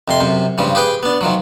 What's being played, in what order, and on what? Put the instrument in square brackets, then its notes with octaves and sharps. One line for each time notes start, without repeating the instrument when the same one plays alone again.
[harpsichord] F2 C3 C6
F#2 C3
G2 C#3 F3 G3
G4 G#4 B4 G5
B3 D4
D#3 F3 F#3